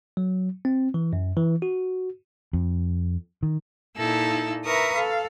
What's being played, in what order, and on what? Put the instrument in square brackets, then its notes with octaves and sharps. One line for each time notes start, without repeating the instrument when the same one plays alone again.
[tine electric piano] F#3
C4
E3
F#2
E3
F#4
[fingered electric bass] F2
D#3
[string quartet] A#2 D#4 E4 A4 E6
A#4 B4 E5 A#5 C#6 D#6
A4 F5